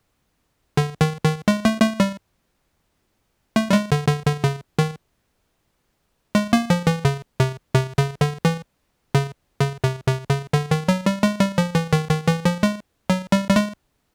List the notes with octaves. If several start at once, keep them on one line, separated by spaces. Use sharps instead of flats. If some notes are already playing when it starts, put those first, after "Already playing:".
D3
D#3
D#3
G#3
A3
A3
G3
A3
G3
G#3
D3
D3
D3
C#3
D#3
G#3
A#3
F3
E3
C#3
C3
C3
C#3
D3
E3
C#3
C#3
C3
C3
C#3
D3
D#3
F#3
G3
G#3
G3
F3
E3
D#3
D#3
E3
F3
G#3
F#3
G3
G3
G#3